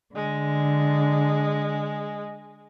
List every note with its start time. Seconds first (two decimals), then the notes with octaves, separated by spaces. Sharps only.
0.15 D3 G#3